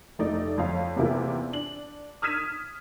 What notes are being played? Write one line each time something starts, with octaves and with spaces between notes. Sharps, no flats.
F1 A3 D#4 D5
F2 C#5 F5
E2 C3 A#3 E4 F4
D4 F#7
D#6 F6 G#6 B6 D#7 E7